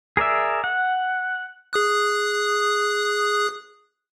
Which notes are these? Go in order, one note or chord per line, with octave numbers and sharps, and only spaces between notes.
G#4 A#4 D5 E5
F#5
G#4 D#6 F#6